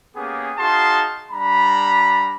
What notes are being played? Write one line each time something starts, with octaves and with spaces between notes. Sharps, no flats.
A#3 B3 C#4 G4 G#4
D#4 F#4 G#4 F5 A5 C6
G3 D4 A#5 B5